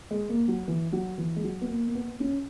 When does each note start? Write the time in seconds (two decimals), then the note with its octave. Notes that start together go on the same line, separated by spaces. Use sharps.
0.11 G#3
0.29 A#3
0.48 F#3
0.68 E3
0.92 F#3
1.18 E3
1.36 G#3
1.44 F#3
1.61 B3
1.69 A#3
1.87 A#3
1.95 B3
2.20 C#4